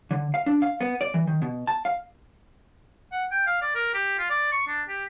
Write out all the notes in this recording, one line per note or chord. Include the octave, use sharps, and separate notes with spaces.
D3
F5
D4
F5
B3
D5
E3
D#3
B2
A5
F5
F#5
G5
F5
D5
A#4
G4
F4
D5
C#6
D4
G4